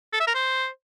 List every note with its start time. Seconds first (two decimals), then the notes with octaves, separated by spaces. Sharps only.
0.13 A4
0.20 E5
0.27 A#4
0.34 C5